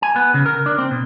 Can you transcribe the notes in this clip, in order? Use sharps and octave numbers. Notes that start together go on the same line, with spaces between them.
G#5
B3
C#3
A#4
D4
C4
B2